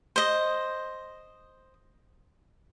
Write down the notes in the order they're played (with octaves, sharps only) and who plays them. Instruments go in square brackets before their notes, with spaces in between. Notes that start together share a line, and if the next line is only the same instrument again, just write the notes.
[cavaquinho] C5 D#5